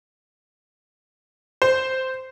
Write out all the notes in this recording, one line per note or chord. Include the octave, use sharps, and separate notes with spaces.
C5